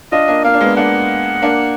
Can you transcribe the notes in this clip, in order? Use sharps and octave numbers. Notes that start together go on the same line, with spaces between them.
D4 F4 D#5
A#3 D4
A#3 F5
D4
G#3 B3
A#3 D4 F#5
A#3 D4